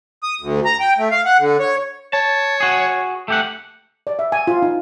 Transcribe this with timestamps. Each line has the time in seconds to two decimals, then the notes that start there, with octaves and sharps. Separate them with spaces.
0.23 D#6
0.41 D2
0.65 A#5
0.80 G5
0.98 A3
1.11 F5
1.25 F#5
1.40 D3
1.60 C#5
2.13 C#5 A5
2.60 F#4 G#4
3.28 A3 G4 F#5
4.07 D5
4.19 E5
4.32 G#5
4.47 F4
4.62 D#4